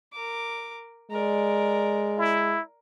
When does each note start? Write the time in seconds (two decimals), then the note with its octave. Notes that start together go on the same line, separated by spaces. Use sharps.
0.13 A#4 D6
1.11 G#3 A#4 D5
2.18 E4